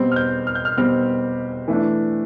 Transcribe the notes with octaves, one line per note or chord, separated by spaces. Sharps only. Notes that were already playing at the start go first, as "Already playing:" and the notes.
Already playing: B2 G3 C4
F6
G6
F6
G6
F6
B2 G3 C4 F6
E3 A3 D4